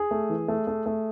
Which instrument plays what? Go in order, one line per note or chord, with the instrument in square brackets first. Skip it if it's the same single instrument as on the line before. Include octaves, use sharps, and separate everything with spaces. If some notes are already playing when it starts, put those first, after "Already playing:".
Already playing: [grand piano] G#4
A3
E3
A3
A3
A3